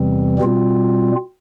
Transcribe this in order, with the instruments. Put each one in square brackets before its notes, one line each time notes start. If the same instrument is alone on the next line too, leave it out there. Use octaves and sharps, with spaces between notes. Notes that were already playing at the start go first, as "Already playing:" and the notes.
Already playing: [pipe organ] E2 C3 E3 G3 C4
B2 G3 C4 F4